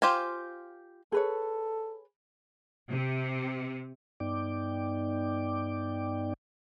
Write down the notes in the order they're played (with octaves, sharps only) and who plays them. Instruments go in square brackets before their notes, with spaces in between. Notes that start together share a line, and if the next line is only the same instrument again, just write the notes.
[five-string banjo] F4 G4 C5 F5 G#5
[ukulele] G#4 B4 C#5 [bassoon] A4
[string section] C3
[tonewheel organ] G2 B3 D#4 D5 G5 D6